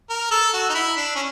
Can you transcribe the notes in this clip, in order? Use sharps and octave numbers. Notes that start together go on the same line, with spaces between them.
A#4
A4
F#4
D#4
E4
D4
C#4